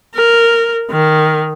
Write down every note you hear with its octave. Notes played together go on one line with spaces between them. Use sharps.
A#4
D#3